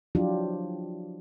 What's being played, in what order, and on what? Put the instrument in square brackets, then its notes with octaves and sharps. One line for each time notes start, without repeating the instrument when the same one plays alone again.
[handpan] F3 F#3 D4 E4 F4 G4